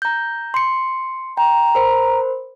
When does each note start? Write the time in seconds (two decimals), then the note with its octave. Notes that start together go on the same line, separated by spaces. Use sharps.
0.02 A#5 G6
0.54 C6 C#7
1.37 G5 A#5
1.75 A#4 C5 B5